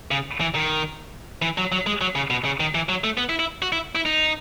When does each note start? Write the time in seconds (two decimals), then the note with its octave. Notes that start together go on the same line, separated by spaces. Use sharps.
0.11 C#3
0.40 E3
0.55 D#3
1.42 E3
1.58 F#3
1.72 F#3
1.87 G#3
2.01 F#3
2.15 C#3
2.30 B2
2.45 C#3
2.60 D#3
2.75 E3
2.89 F#3
3.04 A3
3.17 B3
3.29 E4
3.39 E4
3.62 F#4
3.73 E4
3.95 E4
4.05 D#4